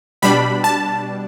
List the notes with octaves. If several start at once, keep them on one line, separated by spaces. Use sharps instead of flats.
B2 G3 D4 B5
A5